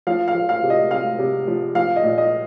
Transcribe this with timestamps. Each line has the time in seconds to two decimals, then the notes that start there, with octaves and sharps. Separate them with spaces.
0.07 F3 F5
0.28 F5
0.35 F3
0.49 F5
0.63 C3
0.70 D#5
0.91 C3 F5
1.19 C3
1.47 F3
1.75 F3 F5
1.96 D#5
2.03 A#2
2.18 D#5